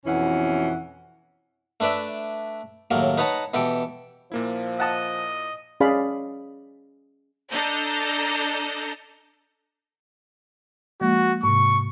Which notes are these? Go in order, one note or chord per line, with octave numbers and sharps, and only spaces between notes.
F2 B2 E3 C#4 F#5
A3 D4 B4 D5 E5
D#2 A2 F#3 A#3
D#4 B4 C#5 F#5 A5 A#5
B2 E3 G4 A4 G5
A#2 F3 A#3 E4
D#5 F#5 A5 D#6
C#4 G#4 D5 F5 B5
D4 A4 D#5 A#5 G6
F3 G#3 A#3 F#4
G#2 C3 C#6